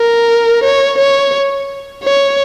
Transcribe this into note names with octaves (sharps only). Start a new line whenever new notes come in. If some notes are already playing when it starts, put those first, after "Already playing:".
Already playing: A#4
C#5
C#5
C#5